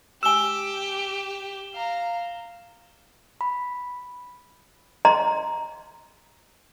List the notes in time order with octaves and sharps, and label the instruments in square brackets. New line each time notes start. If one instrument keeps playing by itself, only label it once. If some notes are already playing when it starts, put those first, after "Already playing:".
[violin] G4 [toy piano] G#5 E6 [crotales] E7 G7
[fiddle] F5 A#5
[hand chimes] B5
[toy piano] D#5 A#5 C6